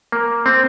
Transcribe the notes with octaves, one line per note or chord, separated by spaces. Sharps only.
A#3
C4